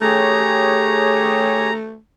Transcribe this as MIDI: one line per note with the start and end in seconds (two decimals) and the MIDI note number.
0.01 1.98 57
0.01 1.70 67
0.01 1.70 68
0.01 1.70 73
0.01 1.73 82